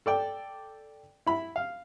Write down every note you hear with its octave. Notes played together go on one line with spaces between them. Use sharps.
A4 D5 G5
E4 B5
F5